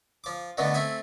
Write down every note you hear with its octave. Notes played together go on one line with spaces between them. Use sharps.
F3 D6
B2 D3 D#3 A3 B3
A3 C4 E5 G#5